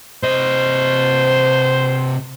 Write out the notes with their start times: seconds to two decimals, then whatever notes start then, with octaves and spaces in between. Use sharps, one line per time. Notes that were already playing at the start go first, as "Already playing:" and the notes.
0.23 C3 C5 D#5